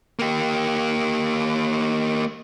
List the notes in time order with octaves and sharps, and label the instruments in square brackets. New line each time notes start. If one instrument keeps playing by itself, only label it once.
[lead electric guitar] A#3 G4